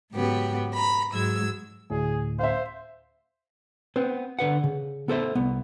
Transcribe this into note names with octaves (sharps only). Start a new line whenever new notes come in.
G#2 C#3 F#3 B3 G4
A#5 B5
G#2 F#3 G#3 E6 G#6
D2 A2 G#4
C5 E5 F5
B3 C4 B4 C5
D3 B4 F#5
C#3
B3 A4 C5 E5
C2 B3